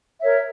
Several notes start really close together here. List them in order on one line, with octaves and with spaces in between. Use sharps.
E5 C#5 A#4